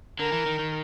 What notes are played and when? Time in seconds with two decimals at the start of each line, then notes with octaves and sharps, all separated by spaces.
0.19 D3 A#4
0.32 E3
0.46 D#3
0.59 D#3